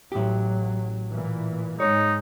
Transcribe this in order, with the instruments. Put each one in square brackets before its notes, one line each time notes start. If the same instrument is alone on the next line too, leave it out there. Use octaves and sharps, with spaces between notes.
[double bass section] A1 F#3 [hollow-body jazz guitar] A2 G4
[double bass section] A#2 E3
[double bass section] G#2 G#3 [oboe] D#4 [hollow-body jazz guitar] C#5